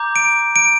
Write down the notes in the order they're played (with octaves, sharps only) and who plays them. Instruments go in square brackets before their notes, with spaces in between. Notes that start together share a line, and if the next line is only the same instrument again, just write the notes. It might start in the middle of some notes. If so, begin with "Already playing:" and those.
Already playing: [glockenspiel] A#5 D6 G6
D7
D7